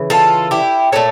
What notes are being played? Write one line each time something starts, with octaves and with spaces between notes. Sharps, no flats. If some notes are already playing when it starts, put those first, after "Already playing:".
Already playing: C#3 E3
F4 A4
E4 G4
A#2 A3 A4 C#5